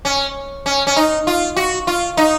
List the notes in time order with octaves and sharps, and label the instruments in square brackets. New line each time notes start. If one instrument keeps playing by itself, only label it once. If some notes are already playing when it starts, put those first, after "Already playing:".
[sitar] C#4
C#4
C#4
D#4
F4
F#4
F4
D#4